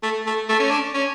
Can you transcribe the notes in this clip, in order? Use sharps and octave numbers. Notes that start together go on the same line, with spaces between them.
A3
A3
A3
C#4
D4
C#4